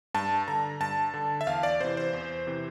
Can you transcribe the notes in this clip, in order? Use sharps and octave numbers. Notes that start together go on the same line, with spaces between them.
G2 A5
D3 A#5
G2 A5
D3
E5
E2 F5
D5
C3 E3 C5
C5
E2
C3 E3